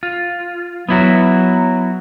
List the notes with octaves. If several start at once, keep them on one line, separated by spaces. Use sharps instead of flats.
F4
F#3 B3 E4 F#4